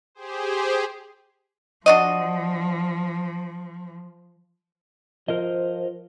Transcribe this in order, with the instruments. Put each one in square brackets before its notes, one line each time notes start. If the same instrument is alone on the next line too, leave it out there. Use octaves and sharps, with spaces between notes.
[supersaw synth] G4 G#4 C5
[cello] F3 [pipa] D4 F#4 D#5
[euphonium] F3 [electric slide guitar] A#4 C5 D#5